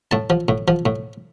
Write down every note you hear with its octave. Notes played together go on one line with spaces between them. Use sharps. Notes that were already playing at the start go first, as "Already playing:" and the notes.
A2 A5
F3
A2
F3
A2